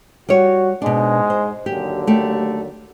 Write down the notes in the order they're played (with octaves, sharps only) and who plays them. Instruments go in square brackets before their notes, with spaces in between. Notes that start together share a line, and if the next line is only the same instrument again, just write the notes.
[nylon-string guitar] G3 C#5 [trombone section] F#4
[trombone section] G#2 G#3 [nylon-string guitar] B2 D4
[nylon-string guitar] C5
[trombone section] D#2 D3 F#3 [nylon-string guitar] G4
[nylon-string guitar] A3 G4